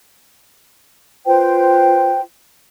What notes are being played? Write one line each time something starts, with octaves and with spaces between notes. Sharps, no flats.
F4 B4 C5 G5